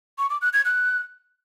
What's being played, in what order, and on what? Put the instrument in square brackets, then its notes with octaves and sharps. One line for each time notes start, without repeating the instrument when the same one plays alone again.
[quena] C#6
D6
F#6
G#6
F#6